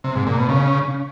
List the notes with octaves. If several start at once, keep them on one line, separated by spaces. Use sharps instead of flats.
C3
G#2
A#2
B2
C#3